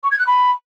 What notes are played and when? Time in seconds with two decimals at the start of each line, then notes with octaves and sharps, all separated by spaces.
0.03 C#6
0.11 G#6
0.19 F#6
0.26 B5